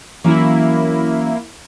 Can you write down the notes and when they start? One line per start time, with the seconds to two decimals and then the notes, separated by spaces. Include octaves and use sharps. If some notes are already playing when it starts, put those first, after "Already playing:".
0.24 E3 F#3 A#3 C#4 E4